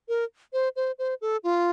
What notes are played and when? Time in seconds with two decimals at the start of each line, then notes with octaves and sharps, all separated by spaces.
0.09 A#4
0.53 C5
0.76 C5
0.99 C5
1.21 A4
1.44 F4